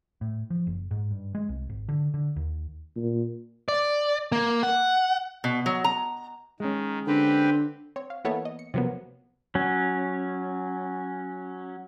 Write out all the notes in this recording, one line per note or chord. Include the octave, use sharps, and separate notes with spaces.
A2
F3
F#1
G#2
G2
G#3
C2
G#1
D3
D3
D#2
A#2
D5
A#3
F#5
B2
F#3
A#5
D#3 G#3 C#4
D3 C4 G4 B4
C4 C#5
F5
E3 A#3 B3 A4 C#5
D#5
C#7
C3 F3 F#3 A#3 B3
F#3 C#4